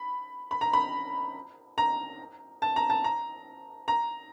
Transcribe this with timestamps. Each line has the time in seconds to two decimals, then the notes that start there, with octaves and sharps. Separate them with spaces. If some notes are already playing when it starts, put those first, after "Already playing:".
Already playing: B5
0.51 B5
0.61 A#5
0.73 B5
1.78 A#5
2.62 A5
2.76 A#5
2.90 A5
3.04 A#5
3.88 A#5